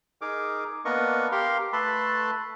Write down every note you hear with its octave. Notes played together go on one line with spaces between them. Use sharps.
D#4 G#4 A#4 D6
A#3 B3 D4 A#4 D#5 C#6
G4 A#4 F5 C6
A3 A4 B4 A5 B5 C6